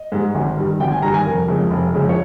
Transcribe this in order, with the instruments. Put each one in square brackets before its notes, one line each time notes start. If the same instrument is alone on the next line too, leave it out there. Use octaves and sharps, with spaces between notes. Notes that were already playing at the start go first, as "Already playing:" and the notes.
Already playing: [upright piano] D#5
G#2 G3
G#1
G2 D#3 G3
G#1 G5
G#5
G2 D#3 G3 A#5
G#5
F1 A#4
F2 C#3 G#3
F1
F2 C#3 G#3
C#5